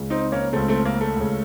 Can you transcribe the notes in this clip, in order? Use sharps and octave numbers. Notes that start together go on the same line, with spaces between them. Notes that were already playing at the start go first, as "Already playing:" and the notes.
Already playing: C#2 C#3
C4 D#4
A#3 C#4
C#2 C#3 A3 C4
A3 C4
A#3
A3
C#2 C#3